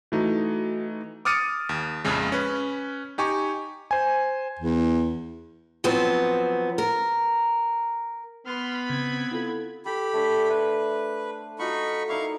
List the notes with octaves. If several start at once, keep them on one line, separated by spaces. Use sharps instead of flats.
E3 A3 D#4 F#4
D6 D#6 F6 A6 C#7 D#7
D#2
A#1 F2 C#3 G#3
C#4 B4
D#4 G4 G#5 C#6
C5 G#5
E2
F3 F#3 B3 C4
A#4
B3 B5 C6 F6
C#3 C4 G#6
E4 F4 A4
G4 A4 B5
A3 D4 C#5
B4 C5 E5
D#4 F4 F#4 B5 C#6
D#4 E4 A#4 D5 F5 C#6